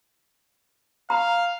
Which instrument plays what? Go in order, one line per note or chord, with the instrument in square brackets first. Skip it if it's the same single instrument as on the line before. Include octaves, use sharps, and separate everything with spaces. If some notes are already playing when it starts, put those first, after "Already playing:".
[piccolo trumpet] F5 [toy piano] A#5